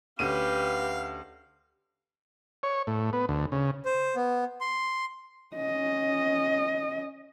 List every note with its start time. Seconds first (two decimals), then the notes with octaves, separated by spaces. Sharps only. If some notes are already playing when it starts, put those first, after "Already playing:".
0.19 D2 C#4 G4 B4 F5 D#7
2.63 C#5
2.87 A2
3.13 B3
3.29 D2
3.52 C#3
3.85 C5
4.16 B3
4.61 C6
5.56 C#4 D#5